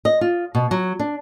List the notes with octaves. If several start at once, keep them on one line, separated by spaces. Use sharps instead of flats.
D#5
F4
B2
F#3
D4